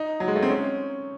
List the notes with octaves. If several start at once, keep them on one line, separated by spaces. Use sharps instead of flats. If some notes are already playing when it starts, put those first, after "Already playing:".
Already playing: D#4
F#3
G#3
A3
C4
C#4